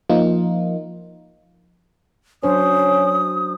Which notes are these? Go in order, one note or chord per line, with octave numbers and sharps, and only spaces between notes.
F3 A#3 D#4 F4
F#3 C#4 D4 C5 D#6